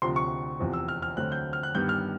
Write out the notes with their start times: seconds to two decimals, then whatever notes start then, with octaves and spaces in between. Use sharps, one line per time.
0.02 D2 C3 F3 C6
0.16 C#6
0.59 F1 E2 C3 F3
0.73 E6
0.88 F6
1.02 F6
1.17 D2 D3 F#3 A3 C4 F#6
1.32 G6
1.53 F6
1.63 F#6
1.75 G2 D#3 G3 B3 G6
1.89 F6